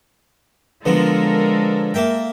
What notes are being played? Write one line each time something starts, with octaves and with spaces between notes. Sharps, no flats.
D3 F3 G#3 B3 A4 A#4
A#3 E5 G5